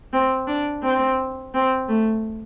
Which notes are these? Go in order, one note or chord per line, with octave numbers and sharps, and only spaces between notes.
C4
D4
C4
C4
A3